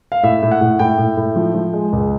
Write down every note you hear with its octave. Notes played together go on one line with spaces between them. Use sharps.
F5
A2 E5
A2
F#5
A2
A2 G5
A2
A2
F3
F3
G#3
C#2